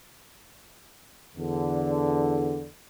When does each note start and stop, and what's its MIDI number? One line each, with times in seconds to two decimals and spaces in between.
1.37 2.66 40
1.37 2.66 50